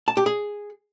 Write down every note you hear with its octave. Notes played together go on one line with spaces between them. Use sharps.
A5
G4
G#4